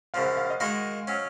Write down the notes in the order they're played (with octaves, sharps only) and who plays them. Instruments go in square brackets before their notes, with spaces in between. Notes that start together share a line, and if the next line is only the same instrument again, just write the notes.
[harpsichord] F#2 C#3 F3 [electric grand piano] F5
[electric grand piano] F#5
F5
D#5
[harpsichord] D#3 G#3 D#4 F#4 A#4 [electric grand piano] F5
[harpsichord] F#3 C#4